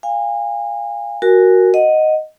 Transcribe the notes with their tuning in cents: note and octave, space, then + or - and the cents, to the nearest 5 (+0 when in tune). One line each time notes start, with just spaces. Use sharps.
F5 +0 G#5 -35
F#4 +0 A#4 +0 G#5 +0
D#5 +0 F#5 +0